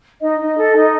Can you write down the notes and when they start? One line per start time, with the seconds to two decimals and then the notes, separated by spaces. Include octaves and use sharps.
0.21 D#4 D#5
0.39 D#4
0.57 A4
0.76 D#4